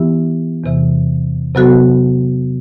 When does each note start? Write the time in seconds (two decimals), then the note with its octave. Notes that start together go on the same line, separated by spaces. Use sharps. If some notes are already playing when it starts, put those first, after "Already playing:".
Already playing: E3 B3 E4 G4
0.64 E2 C3 E3
1.55 C3 F#3 B3 F#4 A4